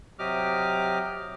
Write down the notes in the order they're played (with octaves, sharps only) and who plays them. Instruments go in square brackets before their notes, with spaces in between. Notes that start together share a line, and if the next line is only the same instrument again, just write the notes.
[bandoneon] C3 F#3 G4 D#5 D6 F6